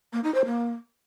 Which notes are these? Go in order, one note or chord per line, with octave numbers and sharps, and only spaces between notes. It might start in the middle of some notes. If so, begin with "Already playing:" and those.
A#3
D#4
C5
A#3